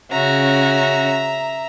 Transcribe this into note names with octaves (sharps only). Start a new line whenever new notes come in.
C#3 C#4 F#4 E5 A#5